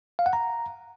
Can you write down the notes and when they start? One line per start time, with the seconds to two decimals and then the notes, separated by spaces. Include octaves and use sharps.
0.19 F5
0.26 F#5
0.33 A#5